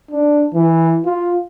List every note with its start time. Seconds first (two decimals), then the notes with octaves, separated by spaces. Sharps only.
0.11 D4
0.54 E3
1.06 F4